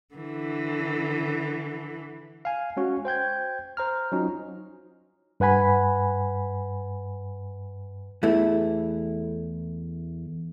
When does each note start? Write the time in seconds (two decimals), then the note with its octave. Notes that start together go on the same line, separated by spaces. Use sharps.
0.14 D3 E3
2.45 F5 G#5
2.77 G#3 C#4 F#4
3.05 C5 G5 G6 G#6
3.77 C5 A#5 F6
4.12 F#3 C#4 D#4 F4
5.40 G2 B4 F#5 G#5 B5
8.23 E2 E3 A3 E4